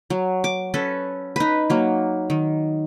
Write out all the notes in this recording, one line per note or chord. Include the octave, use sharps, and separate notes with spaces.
F#3
D6
C#4 A4 B4
D#4 B4
F#3 A#3
D#3